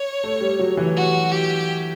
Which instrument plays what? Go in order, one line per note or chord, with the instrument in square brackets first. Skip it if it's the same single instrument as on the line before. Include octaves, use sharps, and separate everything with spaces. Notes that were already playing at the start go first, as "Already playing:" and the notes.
Already playing: [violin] C#5
[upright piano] A3
G3
F#3
E3
[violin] F#4
G4